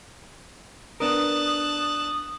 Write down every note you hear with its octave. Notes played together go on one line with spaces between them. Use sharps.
B3 D4 A#4 A5 D#6 F#6